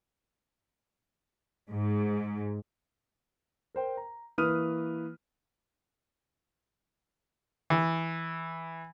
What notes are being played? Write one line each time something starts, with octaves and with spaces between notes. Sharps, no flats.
G#2
A#4 C5 G5
A#5
E3 A#3 B4 D#6 F6 D#7
E3